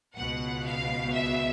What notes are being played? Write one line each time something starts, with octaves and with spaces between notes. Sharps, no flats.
C#2 B2 F#5
F5
E5